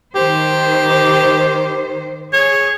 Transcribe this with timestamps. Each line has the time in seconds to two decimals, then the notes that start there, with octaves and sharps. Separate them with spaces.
0.15 D#3 G4 C5
2.33 G#4 C#5